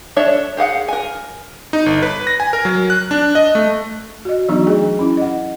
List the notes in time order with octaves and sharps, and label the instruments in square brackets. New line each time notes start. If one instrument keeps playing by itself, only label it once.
[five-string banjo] D4 A4 C#5 E5
G4 G#4 F5 F#5
A#4 G#5
[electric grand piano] D#4
G1
B4
A#6
G#5
A#4
F#3
F#6
D4
D#5
A3
[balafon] F#4 D#5
E3 F#3 B3 D4 D#4 F#4
A3 D4 G#4 D#5
C#4 E4
D#5 F#5